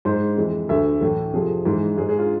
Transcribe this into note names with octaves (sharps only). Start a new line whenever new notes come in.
G#2 G#3 C5
F2 E3 G#3
D2 D3 A3 E5
A2 E3 A3
F2 C3 F3 A3 G#4
G#2 E3 G#3
G#2 G#3 G#4
G#4
F4